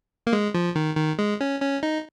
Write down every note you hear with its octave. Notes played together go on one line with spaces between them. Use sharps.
A#3
G#3
F3
D#3
D#3
G#3
C#4
C#4
D#4